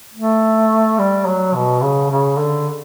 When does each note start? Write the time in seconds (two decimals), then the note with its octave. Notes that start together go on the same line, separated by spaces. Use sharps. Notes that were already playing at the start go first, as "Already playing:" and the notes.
0.15 A3
0.99 G3
1.26 F#3
1.55 B2
1.82 C#3
2.10 C#3
2.38 D3